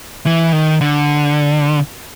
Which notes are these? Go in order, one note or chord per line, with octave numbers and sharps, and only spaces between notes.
E3
D#3
D3